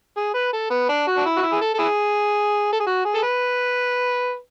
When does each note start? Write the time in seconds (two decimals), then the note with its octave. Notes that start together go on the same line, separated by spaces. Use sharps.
0.17 G#4
0.34 B4
0.53 A4
0.70 B3
0.89 D4
1.07 F#4
1.17 D4
1.25 E4
1.37 F#4
1.42 E4
1.52 G#4
1.61 A4
1.74 A4
1.79 E4 G#4
2.73 A4
2.80 G#4
2.87 F#4
3.05 G#4
3.15 A4
3.23 B4